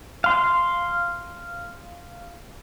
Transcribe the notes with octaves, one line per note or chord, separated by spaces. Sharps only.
F5 C6